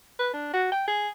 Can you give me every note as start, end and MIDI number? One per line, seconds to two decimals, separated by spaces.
0.19 0.30 71
0.34 0.50 62
0.53 0.70 66
0.72 0.84 79
0.88 1.09 68